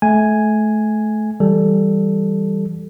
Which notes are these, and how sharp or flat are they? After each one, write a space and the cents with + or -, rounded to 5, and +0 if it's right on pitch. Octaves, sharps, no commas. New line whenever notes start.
A3 -30 G#5 +0
E3 -5 G3 +0 A4 +0